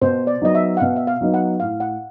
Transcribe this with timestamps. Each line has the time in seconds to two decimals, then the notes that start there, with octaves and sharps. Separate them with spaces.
0.01 B2 C5
0.27 D5
0.41 F#3 B3 D#4 D#5
0.55 E5
0.77 F#5
0.80 B2 F5
0.96 E5
1.07 F5
1.21 F#3 B3 D#4
1.34 F#5
1.60 A2 F5
1.80 F#5